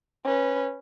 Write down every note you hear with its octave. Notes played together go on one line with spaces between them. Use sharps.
C#4 B4